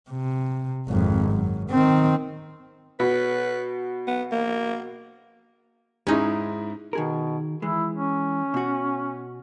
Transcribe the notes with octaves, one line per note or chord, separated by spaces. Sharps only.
C3
G#1 F2
F#2
D#3 C4
B2 B4
B3
A#3
G#2 G#3 C#4 D#4 E4
B2 D#3 G#4 A#4
E3 G#3 E4
C#4
B2 F#4